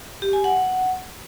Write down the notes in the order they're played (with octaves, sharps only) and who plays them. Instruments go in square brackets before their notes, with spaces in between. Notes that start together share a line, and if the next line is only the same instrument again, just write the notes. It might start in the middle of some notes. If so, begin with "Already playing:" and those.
[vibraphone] G4
G#5
F#5